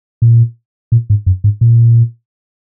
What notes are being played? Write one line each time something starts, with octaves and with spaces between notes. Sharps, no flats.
A#2
A#2
G#2
F#2
G#2
A#2